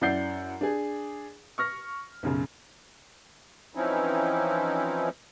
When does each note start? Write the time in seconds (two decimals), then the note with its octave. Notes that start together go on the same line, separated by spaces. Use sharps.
0.01 F#2 E4 D5 F#5 G6 C7
0.61 D4 G#4
1.58 C#6 F6 A#6
2.23 B1 F#2 C#3
3.75 E3 F3 C4 C#4 D#4 E4